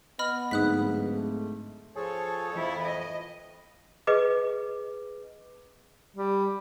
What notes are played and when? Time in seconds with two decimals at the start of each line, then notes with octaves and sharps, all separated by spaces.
0.19 B3 D#5 B5 F6
0.51 D1 G#2 D#6 F#6 B6
1.14 A3
1.96 F3 G#4 A4 C#5
2.52 F2 E3 E4
2.84 D#5
4.07 G#4 B4 D#5 D6
6.16 G3